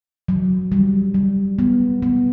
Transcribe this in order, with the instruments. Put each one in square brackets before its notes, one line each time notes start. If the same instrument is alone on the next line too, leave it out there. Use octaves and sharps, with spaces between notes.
[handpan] F#3
G3
G3
B3
B3